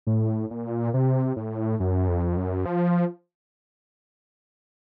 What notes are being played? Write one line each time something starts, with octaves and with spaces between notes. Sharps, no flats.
A2
A#2
C3
A2
F#2
F2
F#2
F3